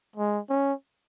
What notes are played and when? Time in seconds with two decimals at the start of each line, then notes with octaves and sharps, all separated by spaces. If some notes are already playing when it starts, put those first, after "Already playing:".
0.16 G#3
0.50 C#4